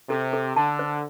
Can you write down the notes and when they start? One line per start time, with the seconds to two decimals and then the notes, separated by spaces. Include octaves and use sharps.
0.10 C3 A4
0.33 A4
0.56 D3 A5
0.79 C5